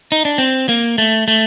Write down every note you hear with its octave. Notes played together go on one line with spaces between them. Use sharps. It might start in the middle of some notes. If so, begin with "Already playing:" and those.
D#4
D4
C4
A#3
A3
A3